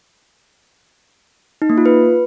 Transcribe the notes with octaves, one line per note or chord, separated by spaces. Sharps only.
D#4
A#3
F4
B4